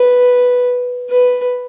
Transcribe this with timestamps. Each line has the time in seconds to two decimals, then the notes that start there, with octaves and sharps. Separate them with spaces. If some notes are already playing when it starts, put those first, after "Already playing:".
Already playing: B4
1.10 B4